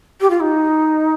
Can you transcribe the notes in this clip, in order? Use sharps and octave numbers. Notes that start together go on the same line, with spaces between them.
G4
F4
D#4